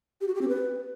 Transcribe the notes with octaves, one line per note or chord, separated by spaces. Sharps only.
G4
F#4
G4
C4
B4